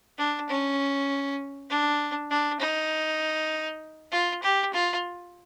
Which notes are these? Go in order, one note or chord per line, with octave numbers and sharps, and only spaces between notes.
D4
C#4
D4
D4
D#4
F4
G4
F4